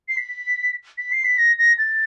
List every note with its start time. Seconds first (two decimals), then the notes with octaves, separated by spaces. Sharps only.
0.09 C7
0.17 B6
0.98 B6
1.12 C7
1.24 B6
1.38 A#6
1.59 A#6
1.78 A6